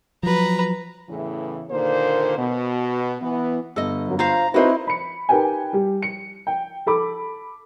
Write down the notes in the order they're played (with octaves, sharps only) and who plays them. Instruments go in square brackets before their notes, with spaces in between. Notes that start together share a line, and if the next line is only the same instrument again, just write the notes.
[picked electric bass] F3 F#3 [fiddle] B4 A#5
[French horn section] E2 A2 C#3 E3
A#2 D3 D#3 A#3 C5
B2
E3 B3
[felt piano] G1 [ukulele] A4 D#5
[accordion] F#2 F#3
[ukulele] F4 C5 F5 [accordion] A#5
[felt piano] C4 D#4 C5 [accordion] E4 [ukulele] F#4 B4
[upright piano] B5 C#7
D#4 G4 A#4 B4 G5 G#5
G3 G4
C#7
G5
A4 B5 D6